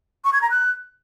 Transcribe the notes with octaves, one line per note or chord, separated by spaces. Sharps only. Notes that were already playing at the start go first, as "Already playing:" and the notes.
C#6
G#6
A#5
F#6